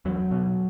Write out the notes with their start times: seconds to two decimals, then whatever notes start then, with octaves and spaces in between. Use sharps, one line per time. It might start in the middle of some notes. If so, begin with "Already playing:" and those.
0.05 E2 F#3
0.31 B2